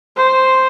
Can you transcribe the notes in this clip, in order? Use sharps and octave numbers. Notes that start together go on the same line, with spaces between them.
C5